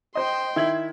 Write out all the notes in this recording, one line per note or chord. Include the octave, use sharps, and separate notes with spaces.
C5 D#5 G5 C6
D#3 E4 E5 G#6 F#7